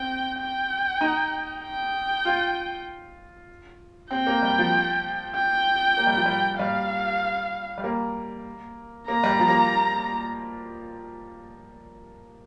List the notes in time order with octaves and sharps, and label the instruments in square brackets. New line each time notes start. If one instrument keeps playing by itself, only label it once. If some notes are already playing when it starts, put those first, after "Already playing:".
Already playing: [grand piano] C4 [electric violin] G5
[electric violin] G5
[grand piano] D#4
[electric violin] G5
[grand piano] F4
[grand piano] C4 [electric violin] G5
[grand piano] A#3
G3
F3
[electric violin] G5
[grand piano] A#3
G3
F3
G3
[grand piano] G3 [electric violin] F5
[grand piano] G3
A#3
[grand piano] A#3 [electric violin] A#5
[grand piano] G3
F3
A#3